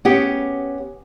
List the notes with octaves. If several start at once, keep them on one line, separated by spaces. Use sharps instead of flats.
B3 C#4 G4